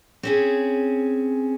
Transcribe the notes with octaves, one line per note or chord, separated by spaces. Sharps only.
C4 C#4 G#4